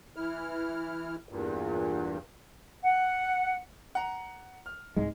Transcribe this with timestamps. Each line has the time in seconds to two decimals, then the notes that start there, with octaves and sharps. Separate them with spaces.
0.16 E3 E4 F6
1.29 E2 G2 A#2
2.84 F#5
3.95 F#5 A#5
4.66 F6
4.96 C2 G#2 G#3